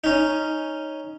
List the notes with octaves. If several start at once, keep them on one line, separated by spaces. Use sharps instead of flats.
C#4 D#4